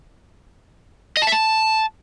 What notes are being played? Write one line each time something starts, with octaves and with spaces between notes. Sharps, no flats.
D#5
A5
E5
A5